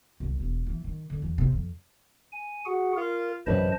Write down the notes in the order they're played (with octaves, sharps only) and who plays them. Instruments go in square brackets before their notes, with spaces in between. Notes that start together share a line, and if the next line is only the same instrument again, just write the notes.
[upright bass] C2
E1
E3
D#3
D3
E2
C3
F2
[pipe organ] G#5
F#4 G#4 F#5
[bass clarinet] F4 [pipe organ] A#4
[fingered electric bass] A1 F#2 C3 [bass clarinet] B4 [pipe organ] C5 D#5 A5